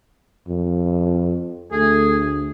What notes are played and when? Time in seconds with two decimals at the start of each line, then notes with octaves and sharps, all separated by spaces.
0.48 F2
1.72 D2 A3 G#4